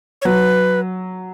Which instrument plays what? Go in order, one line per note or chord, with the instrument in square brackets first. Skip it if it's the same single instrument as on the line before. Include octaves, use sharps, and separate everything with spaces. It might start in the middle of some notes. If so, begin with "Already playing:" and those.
[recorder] C#5
[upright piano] F#3 [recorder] B4